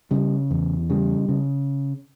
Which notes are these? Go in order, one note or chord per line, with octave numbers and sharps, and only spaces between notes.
C#3 G3
E2
C#3 G3
C#3